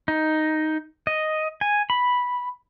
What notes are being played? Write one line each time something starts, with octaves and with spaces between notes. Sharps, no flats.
D#4
D#5
G#5
B5